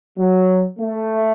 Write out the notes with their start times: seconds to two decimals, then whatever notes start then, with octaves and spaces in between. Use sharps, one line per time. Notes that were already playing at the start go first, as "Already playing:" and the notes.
0.18 F#3
0.80 A3